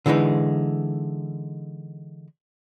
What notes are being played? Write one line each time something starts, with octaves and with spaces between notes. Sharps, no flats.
D3 E3 G#3 C4 D#4